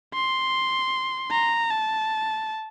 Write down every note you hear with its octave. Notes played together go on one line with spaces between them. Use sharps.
C6
A#5
A5